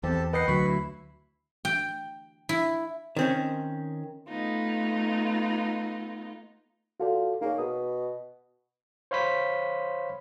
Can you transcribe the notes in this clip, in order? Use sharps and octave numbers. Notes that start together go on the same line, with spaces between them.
E2 C4 G4 A4 A5
B4 D#5 F#5 G5 C7
D2 F#3 B5 C#6
E4
G5
E4
D#3 C4 C#4
A3 B3 D#4 F4
F4 F#4 A4 D5
A#3 D#4 G#4 C#5
B2 D#6
C5 C#5 F5 B5 C6 B6